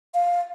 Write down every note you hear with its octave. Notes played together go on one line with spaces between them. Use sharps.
F5